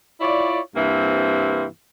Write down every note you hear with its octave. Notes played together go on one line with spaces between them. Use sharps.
E4 F4 C#5 D5
G2 C3 E3 A#3 C4